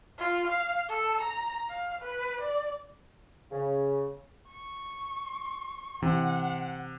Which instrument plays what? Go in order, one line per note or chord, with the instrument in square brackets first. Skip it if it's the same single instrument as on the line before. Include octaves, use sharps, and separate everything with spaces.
[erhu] F4
F5
A4
A#5
F5
B4
D5
[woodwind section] C#3
[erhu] C#6
[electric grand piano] C3 [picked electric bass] E3 [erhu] F#5